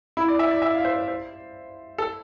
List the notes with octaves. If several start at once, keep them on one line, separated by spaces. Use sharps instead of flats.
E4
D5
E5
D5
E5
F5
C5
C5
C5
A4